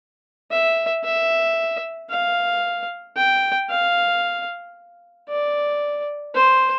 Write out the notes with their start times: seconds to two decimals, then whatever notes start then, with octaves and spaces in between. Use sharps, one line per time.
0.51 E5
1.04 E5
2.10 F5
3.17 G5
3.70 F5
5.29 D5
6.35 C5